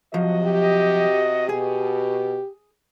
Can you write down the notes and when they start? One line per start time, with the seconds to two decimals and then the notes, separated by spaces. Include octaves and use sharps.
0.14 C3 F3 F#3 F#4 D#5
0.43 G4
1.49 B2 G4 G#4